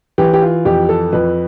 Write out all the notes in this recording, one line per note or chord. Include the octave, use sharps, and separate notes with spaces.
E3 G4
G4
F4
F2 G4
A4
F2 B4